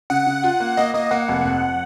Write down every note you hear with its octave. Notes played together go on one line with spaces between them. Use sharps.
C#3 F#5
C#3
F4
A#3
A#3 D#5
A#3 D#5
A#3 F#5
F1
F2